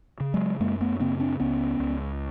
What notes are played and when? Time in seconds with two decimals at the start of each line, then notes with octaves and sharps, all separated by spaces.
0.20 C#3
0.34 F#3 G#3
0.60 F#2 G#3 A#3
0.81 A3 B3
1.00 C#3 A#3 C4
1.20 C4 D4
1.40 C#2 B3 C#4
1.79 C#2